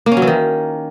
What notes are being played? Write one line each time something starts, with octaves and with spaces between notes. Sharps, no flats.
A#3
C#4
F#3
E3
D#3